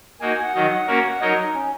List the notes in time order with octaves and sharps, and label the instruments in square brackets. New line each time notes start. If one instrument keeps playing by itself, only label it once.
[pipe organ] A#3 D#4 F#4 [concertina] G#5
[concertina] G#5
F#5
[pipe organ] D#3 F#3 D#4
A#3 C#4 F#4 A#4
[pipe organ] F#3 D#4 A#4 C#5 [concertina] D#5
[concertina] D#4
C#4